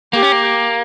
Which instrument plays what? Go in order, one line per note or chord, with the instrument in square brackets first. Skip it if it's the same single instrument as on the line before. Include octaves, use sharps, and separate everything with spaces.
[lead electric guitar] A#3 [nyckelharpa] G4
[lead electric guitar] C#4
A#3